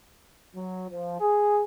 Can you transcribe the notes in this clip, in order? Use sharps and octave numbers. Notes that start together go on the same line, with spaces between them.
F#3
F3
G#4